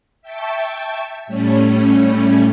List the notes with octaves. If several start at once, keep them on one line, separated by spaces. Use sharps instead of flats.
E5 G5 A5 C#6
A2 G3 A3 C#4